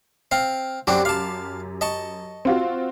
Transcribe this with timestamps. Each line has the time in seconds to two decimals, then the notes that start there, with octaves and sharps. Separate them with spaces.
0.31 C4 F5
0.87 F#2 C4 D4 F#4 G4 D6
1.05 F5 A5
1.81 D#5 A5 C#6
2.45 C4 F4 F#4